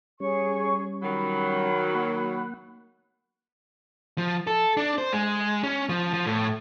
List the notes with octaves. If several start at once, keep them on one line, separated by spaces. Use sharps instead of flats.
G3 C#4 G#4 C#5 C#6
D#3 F#3 B5
A#3 F#5
F3
A4
D4
C5
G#3
C#4
F3
F3
A2